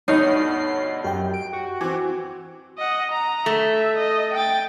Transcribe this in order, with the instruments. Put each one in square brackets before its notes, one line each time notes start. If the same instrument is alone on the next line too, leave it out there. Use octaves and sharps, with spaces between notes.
[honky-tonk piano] D2 G2 B2 [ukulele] D#4 [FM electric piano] C#5 D#5 [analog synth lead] C7
[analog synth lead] F#2 [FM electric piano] G4 G5
[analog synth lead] D7
F#4
[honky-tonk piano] E3 C4 [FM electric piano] G#5 D6
[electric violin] D#5 F#5
A#5
[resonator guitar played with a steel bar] A3 [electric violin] E5
[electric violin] D#5
G5 A6